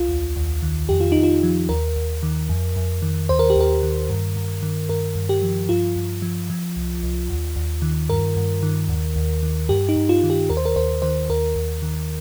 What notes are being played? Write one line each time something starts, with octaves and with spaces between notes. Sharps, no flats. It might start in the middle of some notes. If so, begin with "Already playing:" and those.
Already playing: C2 F4
D#2
D#2
D#3
F2 G4
F4
F2 D#4
F4
F3
D#2 A#4
D#2
D#3
F2
F2
D#3
D#2 C5
A#4
G4
D#2 A#4
D#3
G2
G2
D#3
G2 A#4
G2
G4
F3
G2 F4
G2
F3
F3
C2
C2
D#2
D#2
D#3
G2 A#4
G2
D#3
D#2
D#2
D#3
G2 G4
D#4
G2
F4
D#3
G4
D#2 A#4
C5
A#4
D#2 C5
D#3 C5
D#2 A#4
D#2
D#3